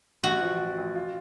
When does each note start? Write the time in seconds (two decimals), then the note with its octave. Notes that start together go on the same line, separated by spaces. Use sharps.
0.23 A1 F#4
0.41 F3
0.59 F3
0.77 A1
0.95 F4